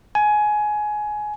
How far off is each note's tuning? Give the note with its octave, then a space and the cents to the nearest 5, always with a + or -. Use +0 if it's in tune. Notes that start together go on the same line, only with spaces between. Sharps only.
G#5 +20